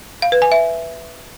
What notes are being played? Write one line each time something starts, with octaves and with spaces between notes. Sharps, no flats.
F5
B4
G#5
E5